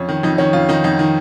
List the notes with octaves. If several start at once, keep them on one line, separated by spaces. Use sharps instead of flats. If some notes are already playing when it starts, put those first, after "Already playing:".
Already playing: F2 C#4
D#3
F2 D#4
D#3 C#4
F2 F4
D#3 D#4
F2 D#4
D#3